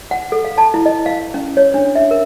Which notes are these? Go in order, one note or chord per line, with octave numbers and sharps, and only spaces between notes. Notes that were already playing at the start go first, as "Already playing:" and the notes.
F#5
A4
F5
A5
E4
D#5
F5
C#4
C#5
D4
E5
A#4